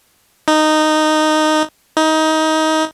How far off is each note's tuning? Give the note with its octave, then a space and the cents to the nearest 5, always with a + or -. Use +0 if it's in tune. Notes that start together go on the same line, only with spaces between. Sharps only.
D#4 -10
D#4 +20